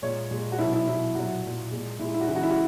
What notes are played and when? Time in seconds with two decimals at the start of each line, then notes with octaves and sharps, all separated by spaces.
0.02 A#2 G#3 C#5
0.31 A#2 G#3
0.52 F#4
0.59 B2 F#3 E4
0.73 E4
0.87 B2 F#3 E4
1.15 A#2 F#3 F#4
1.43 A#2 F#3
1.71 A#2 G#3
1.99 A#2 G#3 E4
2.14 E4
2.21 F#4
2.28 C#3 E3 G#3 E4
2.36 F#4
2.43 E4
2.50 F#4